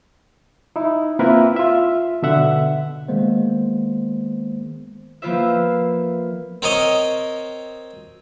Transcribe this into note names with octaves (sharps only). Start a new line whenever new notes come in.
D#4 E4
A#3 C4 E4 F4 A#4 B4
F4 E5
B2 D3 E5 F#5
D#3 G#3 A#3 B3 C5
F3 A#3 B3 F4 C5 E5
C4 A#4 C#5 D#5